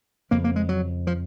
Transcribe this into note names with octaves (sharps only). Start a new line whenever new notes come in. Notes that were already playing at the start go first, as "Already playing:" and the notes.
F2 C#3 A#3
A#3
G#3
F#3
F3